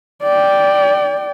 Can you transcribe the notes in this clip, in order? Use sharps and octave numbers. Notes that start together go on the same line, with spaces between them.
D5 G5